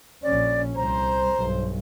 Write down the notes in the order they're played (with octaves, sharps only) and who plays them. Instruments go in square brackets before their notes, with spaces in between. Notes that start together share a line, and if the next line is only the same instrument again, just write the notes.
[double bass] A#1 C#4 [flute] D5
[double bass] C2 [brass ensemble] C5 [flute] A#5
[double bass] B1 G2